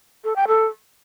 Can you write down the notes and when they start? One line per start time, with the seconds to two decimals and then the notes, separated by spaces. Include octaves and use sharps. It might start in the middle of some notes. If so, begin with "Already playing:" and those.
0.24 A4
0.36 G5
0.48 A4